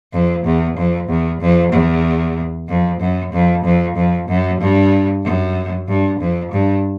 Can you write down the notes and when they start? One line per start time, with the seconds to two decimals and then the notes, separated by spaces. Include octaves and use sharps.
0.13 F2
0.45 E2
0.77 F2
1.09 E2
1.41 F2
1.72 E2
2.69 F2
3.00 F#2
3.33 F2
3.64 F2
3.96 F2
4.28 F#2
4.60 G2
5.24 F#2
5.88 G2
6.20 F2
6.52 G2